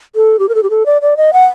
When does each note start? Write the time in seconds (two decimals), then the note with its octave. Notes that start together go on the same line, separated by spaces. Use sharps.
0.16 A4
0.39 G4
0.49 A#4
0.55 A4
0.63 G4
0.70 A4
0.86 D5
1.02 D5
1.17 D#5
1.33 F#5